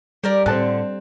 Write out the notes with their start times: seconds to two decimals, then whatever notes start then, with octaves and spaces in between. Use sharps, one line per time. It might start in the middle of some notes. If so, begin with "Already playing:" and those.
0.24 G3 G4 A#4 D5
0.46 A2 D3 C4 A5 F#6